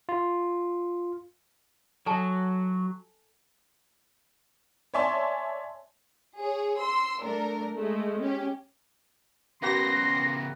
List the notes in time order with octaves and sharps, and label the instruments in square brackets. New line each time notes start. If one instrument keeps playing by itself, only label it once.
[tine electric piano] F4
[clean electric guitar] F#3 [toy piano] A4 G#5 A5
[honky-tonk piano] C#5 D5 E5 G#5 A5 C6
[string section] G#4 C#5
C6 E6
A3 D4 A#4
G#3 A3
C#4 G4
[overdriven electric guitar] C#3 B3 [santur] A#3 F#4 G5 [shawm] C6 [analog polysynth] A#6